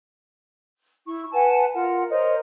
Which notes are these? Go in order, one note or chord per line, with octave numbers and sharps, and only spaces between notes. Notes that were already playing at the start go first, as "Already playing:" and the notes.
E4 C#6
B4 F#5 G#5 A5
F4 A#4 F#5
A#4 C5 C#5 D#5